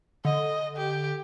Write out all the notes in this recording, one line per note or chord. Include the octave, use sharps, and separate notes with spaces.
D3 D#5
G4